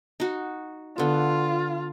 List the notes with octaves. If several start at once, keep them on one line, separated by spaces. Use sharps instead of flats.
D#4 F#4
D3 B3 F4